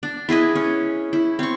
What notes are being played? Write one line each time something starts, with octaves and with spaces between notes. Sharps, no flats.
D4
E4 G#4 B4 D#5
C#4
E4
C4 C#6